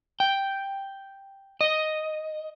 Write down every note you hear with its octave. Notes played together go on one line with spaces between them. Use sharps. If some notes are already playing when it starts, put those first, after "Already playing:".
G5
D#5